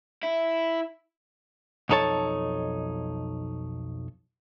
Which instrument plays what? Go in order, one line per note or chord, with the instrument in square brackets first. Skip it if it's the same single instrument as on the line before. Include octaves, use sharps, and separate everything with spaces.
[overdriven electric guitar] E4
[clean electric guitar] B1 F2 D#4 A4 C#5 A5